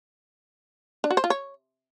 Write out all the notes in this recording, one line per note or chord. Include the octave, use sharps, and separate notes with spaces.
D4
F#4
C5
F4
C#5